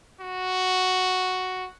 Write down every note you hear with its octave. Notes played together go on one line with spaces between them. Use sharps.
F#4